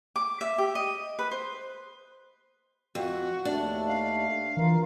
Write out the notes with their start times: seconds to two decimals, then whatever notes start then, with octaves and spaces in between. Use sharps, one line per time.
0.16 D6
0.41 E5
0.58 G4
0.75 D#5
1.19 B4
1.31 C5
2.95 F2 F#4
3.45 D#2 A3 D4
3.87 F5
4.57 E3 F4 A#4